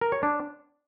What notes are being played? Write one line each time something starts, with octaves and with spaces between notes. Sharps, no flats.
A#4
C#5
D4